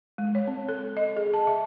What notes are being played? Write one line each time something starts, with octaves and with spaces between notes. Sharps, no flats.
G#3
C#5
C4
A4
D#5
G#4
A5
E5